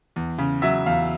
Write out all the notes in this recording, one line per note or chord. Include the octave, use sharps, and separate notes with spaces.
E2
C#3
F#3 E5
E2 F5